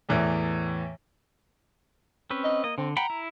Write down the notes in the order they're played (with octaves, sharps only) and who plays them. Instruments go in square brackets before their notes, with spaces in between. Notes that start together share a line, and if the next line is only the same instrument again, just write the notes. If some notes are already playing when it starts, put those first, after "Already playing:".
[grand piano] E2 A2 E3
[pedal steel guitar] C4 C#4 B4
[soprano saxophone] D#5
[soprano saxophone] A#3 [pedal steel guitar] D#5
[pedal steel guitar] D3 [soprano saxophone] C4
[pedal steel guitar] F#5 G5 B5 [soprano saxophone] A#5
[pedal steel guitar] E4